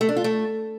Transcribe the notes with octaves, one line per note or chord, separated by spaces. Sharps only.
A3
D4
F4
A3